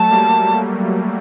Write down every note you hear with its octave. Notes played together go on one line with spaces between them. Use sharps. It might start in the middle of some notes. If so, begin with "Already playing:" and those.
Already playing: F#3 A3 A5
G3 A#3